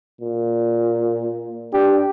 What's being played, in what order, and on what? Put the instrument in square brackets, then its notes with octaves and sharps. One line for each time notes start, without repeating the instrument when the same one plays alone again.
[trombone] A#2
[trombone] D4 [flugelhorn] G4